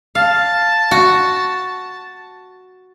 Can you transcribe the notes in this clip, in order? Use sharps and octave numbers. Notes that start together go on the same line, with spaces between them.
F5 A5
F#4